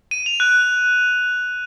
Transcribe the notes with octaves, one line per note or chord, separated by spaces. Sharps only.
D#7
F7
F#6